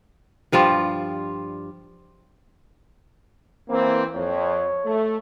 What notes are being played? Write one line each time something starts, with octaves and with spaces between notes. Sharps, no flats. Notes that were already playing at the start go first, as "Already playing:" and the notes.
G2 F3 G3 F4
E3 A#3 C4
F2 C#5
A3